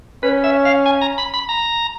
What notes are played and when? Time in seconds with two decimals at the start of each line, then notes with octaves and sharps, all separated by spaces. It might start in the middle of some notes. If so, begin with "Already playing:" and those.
0.23 C#4 B4
0.44 E5
0.65 F5
0.86 G#5
1.02 A#5
1.18 B5
1.34 B5
1.49 A#5